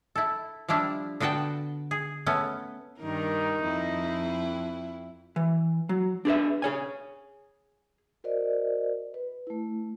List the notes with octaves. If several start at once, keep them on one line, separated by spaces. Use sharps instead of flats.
E4 A4
F3 G3 D4 E4
D3 B3 F#4 G5 A5
G#4
A3 B3 C#4
G2 D#3 D#4 A#4
F2 E4
E3
F#3
D4 G#4 B4 E5
G#4 C#5 G#5
F#4 A#4 C5 D5 D#5
B4
A3 E4